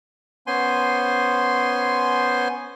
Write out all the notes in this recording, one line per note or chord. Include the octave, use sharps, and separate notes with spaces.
B3 C#4 C5 G#5 C6